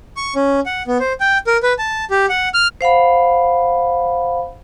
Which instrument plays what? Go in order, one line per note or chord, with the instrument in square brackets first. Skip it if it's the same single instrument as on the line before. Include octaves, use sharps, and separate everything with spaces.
[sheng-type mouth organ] C#6
C#4
F#5
B3
C5
G5
A#4
B4
A5
G4
F#5
F6
[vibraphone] C5 F5 F#5 B5